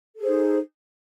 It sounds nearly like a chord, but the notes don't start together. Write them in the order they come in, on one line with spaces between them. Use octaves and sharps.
A4 G#4 C5 D#4